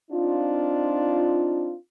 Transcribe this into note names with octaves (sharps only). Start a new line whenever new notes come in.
C4 D4 D#4 F4